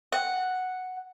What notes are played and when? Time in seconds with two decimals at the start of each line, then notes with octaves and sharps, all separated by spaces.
0.12 F#5